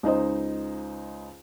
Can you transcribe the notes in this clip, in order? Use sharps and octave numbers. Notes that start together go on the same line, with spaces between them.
C#2 D#4 C5 D#5